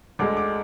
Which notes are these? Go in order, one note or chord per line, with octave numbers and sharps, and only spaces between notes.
D2 D3 G#3 D6
D6